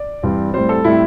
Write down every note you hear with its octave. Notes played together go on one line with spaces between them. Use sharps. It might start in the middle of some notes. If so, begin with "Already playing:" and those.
Already playing: D5
G2 E3 G3 C4
A2 G3 C4 C5
A4
A2 G3 C4 E4